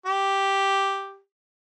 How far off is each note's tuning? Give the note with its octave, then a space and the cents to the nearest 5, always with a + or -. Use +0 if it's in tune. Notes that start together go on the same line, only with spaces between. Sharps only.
G4 +0